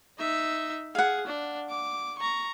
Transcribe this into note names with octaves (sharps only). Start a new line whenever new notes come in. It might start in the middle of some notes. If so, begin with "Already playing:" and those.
D#4 E5
G#4 F5 F#5
D4
D6
A#5 C#6